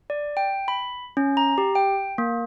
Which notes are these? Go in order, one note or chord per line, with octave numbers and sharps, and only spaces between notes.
D5
G5
B5
C#4
A#5
G4
G5
A#3